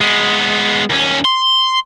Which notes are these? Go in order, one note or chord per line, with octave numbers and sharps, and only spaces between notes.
G#3 B3
D#2 C#4
C6